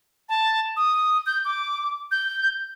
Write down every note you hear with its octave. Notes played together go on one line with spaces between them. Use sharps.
A5
D#6
G6
D6
G6